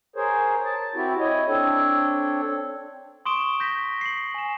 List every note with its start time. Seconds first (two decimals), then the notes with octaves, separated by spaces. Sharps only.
0.16 G#4 A#4 C5 C#5
0.65 A5
0.95 C4 E4 F#4 G4
1.20 E4 C#5 D#5
1.48 C4 D4 A4 C#5
3.26 C6 C#6 D#6 D7 E7 G7
3.60 G6 A#6 B6
4.01 C7 F#7
4.34 G#5 E7